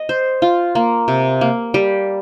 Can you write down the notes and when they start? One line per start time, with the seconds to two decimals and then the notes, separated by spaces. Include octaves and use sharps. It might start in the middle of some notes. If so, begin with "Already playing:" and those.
Already playing: D#5
0.09 C5
0.42 F4
0.75 A#3
1.08 C3
1.41 A#3
1.74 G3